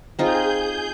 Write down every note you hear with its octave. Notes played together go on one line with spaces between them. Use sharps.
C4 D#4 F4 G#4 G6